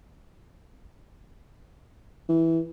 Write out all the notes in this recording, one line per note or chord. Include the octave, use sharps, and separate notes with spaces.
E3